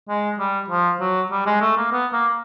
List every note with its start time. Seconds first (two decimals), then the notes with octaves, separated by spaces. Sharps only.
0.09 G#3
0.39 G3
0.70 F3
1.00 F#3
1.31 G3
1.46 G#3
1.61 A3
1.77 A#3
1.92 B3
2.13 A#3